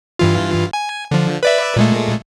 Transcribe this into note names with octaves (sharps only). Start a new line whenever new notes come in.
G2 E3 F4
G#5
D3 F3
B4 D5 E5
A#2 G#3 A3